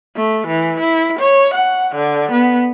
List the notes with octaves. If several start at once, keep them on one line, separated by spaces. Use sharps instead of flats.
A3
E3
E4
C#5
F#5
D3
B3